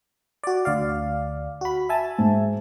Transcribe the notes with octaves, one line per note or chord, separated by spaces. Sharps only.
F#4 D5
D2 D5 F5
F#4 B5
E5 G#5 A5
G#2